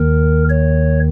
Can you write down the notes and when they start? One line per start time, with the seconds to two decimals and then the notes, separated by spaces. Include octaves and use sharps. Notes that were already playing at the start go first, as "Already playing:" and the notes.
Already playing: D#2 D#3 A#4
0.49 C#5